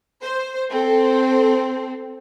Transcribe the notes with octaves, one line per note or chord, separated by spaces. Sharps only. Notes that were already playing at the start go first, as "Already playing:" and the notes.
C5
C4 A4